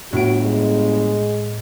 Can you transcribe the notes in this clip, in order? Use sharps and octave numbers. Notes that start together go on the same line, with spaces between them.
G1 A2 F#4 D7
G#3